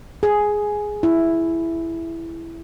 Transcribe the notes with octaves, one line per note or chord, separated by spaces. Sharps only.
G#4
E4